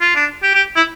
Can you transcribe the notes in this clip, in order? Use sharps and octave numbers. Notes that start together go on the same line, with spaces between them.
F4
D4
G4
G4
E4